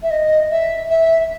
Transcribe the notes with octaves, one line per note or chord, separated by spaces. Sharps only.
E5
D#5
E5
E5